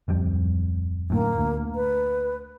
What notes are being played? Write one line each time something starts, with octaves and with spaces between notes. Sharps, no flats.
D1 F2 G3
F#2 A2 D3 A#3
D2
B4